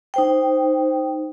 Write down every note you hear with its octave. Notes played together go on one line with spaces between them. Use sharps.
D#4 C5 G5